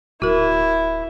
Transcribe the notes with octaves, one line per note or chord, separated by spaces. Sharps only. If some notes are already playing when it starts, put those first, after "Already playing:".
D1 E4 F#4 A#4